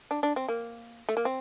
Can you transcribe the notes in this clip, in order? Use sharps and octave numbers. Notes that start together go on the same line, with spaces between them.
D4
D4
C4
A#3
A3
A#3
C4